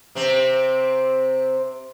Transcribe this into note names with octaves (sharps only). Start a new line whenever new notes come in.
C3 C4